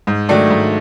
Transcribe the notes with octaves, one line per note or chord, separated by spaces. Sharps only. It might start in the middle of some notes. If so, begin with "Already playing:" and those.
G#2
D#3 F#3 A3 D4
G#2